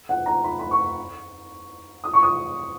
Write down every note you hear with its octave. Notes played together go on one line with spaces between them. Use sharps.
F#5
A#5
B5
B5
C#6
D#6
C#6
D#6